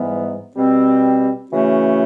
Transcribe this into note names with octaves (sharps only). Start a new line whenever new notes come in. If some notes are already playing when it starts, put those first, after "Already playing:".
Already playing: G#2 E3 G3 B3
B2 G3 C4
C#3 E3 A3 C#4 F#4